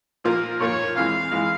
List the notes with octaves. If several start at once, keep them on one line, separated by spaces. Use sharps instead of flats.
A#2 F3 A#3 F4 A#4
A#2 F3 A#3 F4 C#5
F2 E3 G#3 F5
E3 G#3